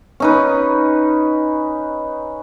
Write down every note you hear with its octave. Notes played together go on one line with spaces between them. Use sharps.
C#4 D#4 B4